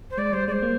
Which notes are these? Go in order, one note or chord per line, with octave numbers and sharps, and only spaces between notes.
C5
G#3 D5
G3 C5
G#3 C5 D5
A#3